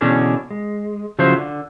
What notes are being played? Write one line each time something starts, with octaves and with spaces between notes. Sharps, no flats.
B2 D3 E3 C#4 D4 G#4
G#3
C#3 F3 F#3 E4 C5
D3